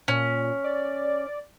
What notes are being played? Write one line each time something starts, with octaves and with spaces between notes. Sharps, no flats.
A#2 C#4
D5